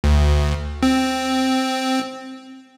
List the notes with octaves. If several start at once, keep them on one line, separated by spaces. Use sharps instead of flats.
D2
C4